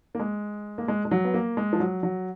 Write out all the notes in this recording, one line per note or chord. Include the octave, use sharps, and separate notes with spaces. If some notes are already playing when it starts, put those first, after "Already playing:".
A#3
G#3
A#3
G#3
G#3
F#3
B3
A#3
G#3
F3
F#3
F#3